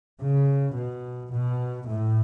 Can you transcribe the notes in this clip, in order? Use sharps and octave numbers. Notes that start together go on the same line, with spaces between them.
C#3
B2
B2
A2